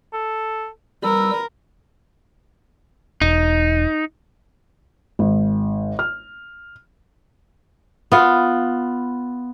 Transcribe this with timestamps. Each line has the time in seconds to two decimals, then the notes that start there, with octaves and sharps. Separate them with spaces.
0.13 A4
1.03 G3 A#4 B4 E6
3.21 E1 D#4
5.19 G#1
5.99 F6
8.12 B3 F4